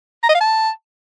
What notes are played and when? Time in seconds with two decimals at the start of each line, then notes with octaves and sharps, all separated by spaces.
0.23 A#5
0.29 D#5
0.35 F5
0.41 A5